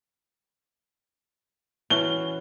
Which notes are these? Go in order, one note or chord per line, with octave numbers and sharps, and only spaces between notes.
E3 C#4 F#4 G7